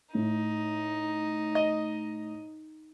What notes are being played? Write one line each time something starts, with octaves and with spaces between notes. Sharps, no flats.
A2 D#4
D#5